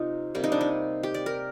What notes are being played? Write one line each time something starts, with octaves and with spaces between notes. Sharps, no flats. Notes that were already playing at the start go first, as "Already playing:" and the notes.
Already playing: C3 D#4 F4
C3 G3 A#3
D#4
D4
D#4
G4
D5
A#4